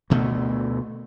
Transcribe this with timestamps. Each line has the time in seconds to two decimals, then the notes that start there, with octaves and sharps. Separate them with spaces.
0.10 D2 B2 A3